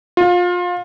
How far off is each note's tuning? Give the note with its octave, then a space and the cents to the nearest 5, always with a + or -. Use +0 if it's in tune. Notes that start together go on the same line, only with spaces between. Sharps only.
F4 +25